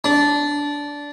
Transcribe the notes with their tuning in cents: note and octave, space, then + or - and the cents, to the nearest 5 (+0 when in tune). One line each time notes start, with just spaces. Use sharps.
D4 -15